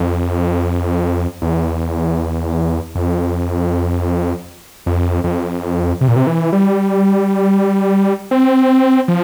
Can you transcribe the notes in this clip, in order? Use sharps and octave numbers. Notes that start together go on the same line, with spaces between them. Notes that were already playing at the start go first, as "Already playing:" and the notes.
Already playing: F2
E2
F2
F2
F2
C3
A#2
C3
E3
G3
C4
F3